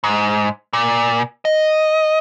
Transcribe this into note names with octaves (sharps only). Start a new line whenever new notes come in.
G#2
A#2
D#5